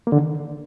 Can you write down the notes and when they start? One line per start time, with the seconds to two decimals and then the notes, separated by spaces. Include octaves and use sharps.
0.07 A#3
0.12 D3
0.17 D#3